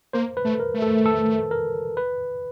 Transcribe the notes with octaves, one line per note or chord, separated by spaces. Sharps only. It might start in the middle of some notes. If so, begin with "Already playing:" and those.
A#3 C5
B4
A3
A#4
A3
A4
A4
A#4
B4